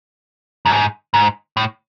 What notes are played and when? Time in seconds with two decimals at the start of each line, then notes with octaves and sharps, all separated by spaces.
0.66 F#2
0.72 G#2
1.14 G#2
1.57 A2